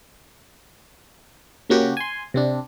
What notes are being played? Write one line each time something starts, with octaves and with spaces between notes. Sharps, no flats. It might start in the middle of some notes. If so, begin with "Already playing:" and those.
C#3 A#3 C#4 F#4 G4
G#5 C6
C3 C4 D4